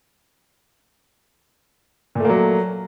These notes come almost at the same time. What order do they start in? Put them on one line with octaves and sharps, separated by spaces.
A#2 A3 A#3 F#3